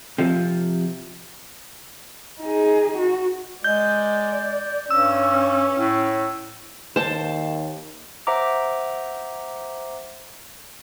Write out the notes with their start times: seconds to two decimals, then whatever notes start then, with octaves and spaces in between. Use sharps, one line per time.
0.18 C3 F3
2.41 D#4 G#4
2.98 F#4
3.64 G#3 D5 G6
4.91 G2 C#4 E6
5.76 A2
6.96 D#2 C5 A5
8.27 C5 E5 F#5 A#5 D6